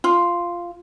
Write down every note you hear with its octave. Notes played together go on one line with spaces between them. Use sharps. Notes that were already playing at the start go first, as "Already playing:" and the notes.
F4